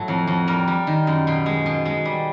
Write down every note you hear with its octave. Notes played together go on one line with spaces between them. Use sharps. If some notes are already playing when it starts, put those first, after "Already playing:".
Already playing: A2 F#3 A4
F2
F2
G3 A#4
G3
D#3
F#2
B2
G#3
B2
G#3
G3